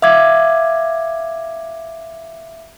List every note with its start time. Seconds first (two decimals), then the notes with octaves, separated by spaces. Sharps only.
0.02 E5 F5 D6 G#6